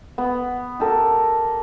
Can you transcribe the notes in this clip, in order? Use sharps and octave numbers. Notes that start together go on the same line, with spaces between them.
B3
G4 A4 A#4